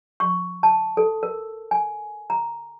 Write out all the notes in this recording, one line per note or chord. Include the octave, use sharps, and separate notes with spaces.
C#6
A5
A4
A#4
G#5
A#5